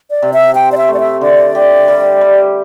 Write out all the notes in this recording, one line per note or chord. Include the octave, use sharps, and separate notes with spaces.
D5
C3
E5
C5 G5
D5
E5
A3
D5
E5
D3 D5
G4
G3
G3